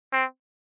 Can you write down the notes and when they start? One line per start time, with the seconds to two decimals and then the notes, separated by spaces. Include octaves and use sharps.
0.12 C4